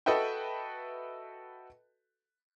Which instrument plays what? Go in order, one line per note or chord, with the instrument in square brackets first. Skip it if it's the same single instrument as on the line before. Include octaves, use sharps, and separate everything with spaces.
[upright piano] F#4 A4 B4 D#5 E5 G5